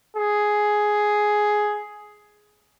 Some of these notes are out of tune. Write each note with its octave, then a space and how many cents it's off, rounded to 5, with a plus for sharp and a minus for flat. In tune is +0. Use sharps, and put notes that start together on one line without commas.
G#4 +10